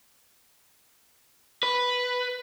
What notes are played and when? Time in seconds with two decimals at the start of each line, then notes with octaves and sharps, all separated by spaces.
1.63 B4